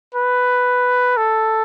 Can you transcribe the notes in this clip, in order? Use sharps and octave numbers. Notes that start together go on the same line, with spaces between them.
B4
A4